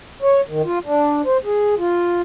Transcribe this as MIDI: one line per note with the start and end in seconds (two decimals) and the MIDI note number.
0.22 0.41 73
0.49 0.62 51
0.65 0.79 65
0.86 1.22 62
1.26 1.37 72
1.45 1.75 68
1.79 2.22 65